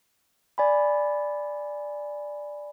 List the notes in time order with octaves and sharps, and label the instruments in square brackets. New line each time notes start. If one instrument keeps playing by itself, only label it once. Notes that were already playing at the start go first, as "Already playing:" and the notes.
[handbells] D5 G#5 B5